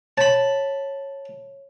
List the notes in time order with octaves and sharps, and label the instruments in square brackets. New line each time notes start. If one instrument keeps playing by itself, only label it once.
[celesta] C#5 [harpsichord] A5 B5